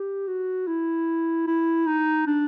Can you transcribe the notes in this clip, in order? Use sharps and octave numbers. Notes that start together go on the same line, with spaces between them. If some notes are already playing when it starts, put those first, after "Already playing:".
Already playing: G4
F#4
E4
E4
D#4
D4